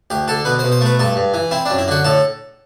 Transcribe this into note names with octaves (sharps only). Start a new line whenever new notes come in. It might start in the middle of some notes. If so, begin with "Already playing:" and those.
D2 G4
D3 A4
B2 B4
C5
B2
C5
A3 B4
G2 A4
G2
E3
C4 E4
D4
F#2
E4
D3 F#4
A2 A4